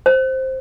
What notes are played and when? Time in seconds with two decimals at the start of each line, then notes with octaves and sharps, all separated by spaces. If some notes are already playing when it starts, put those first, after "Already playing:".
0.06 C5